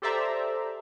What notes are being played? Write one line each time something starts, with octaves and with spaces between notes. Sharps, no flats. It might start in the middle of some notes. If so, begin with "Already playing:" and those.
G4 A4 C5 D5 E5 A#5